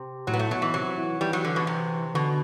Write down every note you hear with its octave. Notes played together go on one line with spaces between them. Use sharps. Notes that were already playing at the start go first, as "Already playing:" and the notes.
Already playing: C3
A2 F#3
B3
A3
B2 F#3
E3
C3 F#3
E3
E3 G3
F#3
D3
B2
C3
B2 D3